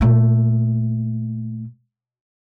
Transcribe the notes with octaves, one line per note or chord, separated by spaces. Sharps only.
A#2 A3